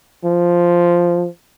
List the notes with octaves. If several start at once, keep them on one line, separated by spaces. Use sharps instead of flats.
F3